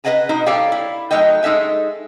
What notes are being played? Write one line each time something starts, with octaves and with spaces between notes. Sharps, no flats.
B4 C5 D#5 F#5 G#5 A#5
B2 D#4 A#5
G3 A4 C#5 D5 F5 G5
E4
F#3 A3 D#4 D#5 G5
G#3 D#4 A4 E5 G#5